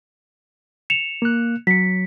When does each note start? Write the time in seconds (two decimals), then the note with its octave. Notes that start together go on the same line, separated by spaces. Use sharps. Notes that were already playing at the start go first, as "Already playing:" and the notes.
0.90 C#7 E7 F7
1.22 A#3 F#6
1.67 F#3 B6 C#7